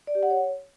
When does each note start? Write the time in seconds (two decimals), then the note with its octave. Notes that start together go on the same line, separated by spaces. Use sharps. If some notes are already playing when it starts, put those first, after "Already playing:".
0.07 D5
0.15 G4
0.23 F#5
0.30 C#5